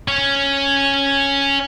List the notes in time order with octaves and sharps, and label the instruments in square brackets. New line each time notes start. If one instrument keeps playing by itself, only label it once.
[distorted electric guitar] C#4 C#5